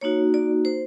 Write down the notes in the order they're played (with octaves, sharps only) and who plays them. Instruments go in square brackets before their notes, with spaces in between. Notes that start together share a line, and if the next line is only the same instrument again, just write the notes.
[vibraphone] A#3 D#4 F#4 C#5
D5
C5